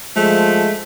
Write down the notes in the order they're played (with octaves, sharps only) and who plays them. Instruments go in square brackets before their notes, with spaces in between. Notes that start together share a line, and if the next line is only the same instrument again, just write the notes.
[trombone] F3 [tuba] G#3 [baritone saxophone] A3